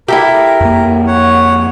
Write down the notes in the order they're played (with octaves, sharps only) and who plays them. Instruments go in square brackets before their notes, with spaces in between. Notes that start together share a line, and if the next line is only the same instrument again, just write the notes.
[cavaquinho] E4 A4 E5 [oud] G4 [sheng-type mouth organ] A#4
[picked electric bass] F2 A#3
[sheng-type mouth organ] C#5 F#5